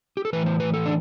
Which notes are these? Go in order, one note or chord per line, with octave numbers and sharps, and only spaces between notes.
G4
A4
A2 E3 B4
C5
B4
A4
D4